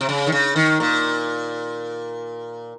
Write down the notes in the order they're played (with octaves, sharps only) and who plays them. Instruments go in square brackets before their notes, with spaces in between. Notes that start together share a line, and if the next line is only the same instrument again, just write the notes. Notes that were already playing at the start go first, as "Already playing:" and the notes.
[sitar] C3
C#3
D#3
C#3
D#3
A#2